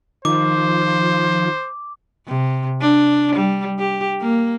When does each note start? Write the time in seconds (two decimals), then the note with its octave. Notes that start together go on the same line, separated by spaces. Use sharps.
0.25 D#3 F3 D#4 C5 D6
2.28 C3
2.81 D4
3.36 G3
3.79 G4
4.21 A#3